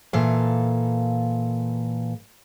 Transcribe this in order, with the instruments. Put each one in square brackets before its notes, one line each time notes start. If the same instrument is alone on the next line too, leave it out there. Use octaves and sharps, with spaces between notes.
[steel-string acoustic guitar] A#2 E3 A4 F5